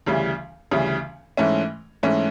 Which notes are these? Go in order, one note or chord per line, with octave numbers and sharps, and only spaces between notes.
D2 C#3 E3 G3
D2 C#3 E3 G3
G#2 E3 A3 C#4
G#2 E3 A3 C#4